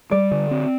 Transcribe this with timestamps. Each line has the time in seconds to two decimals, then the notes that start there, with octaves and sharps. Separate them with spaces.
0.11 G3 D5
0.31 D3
0.51 C4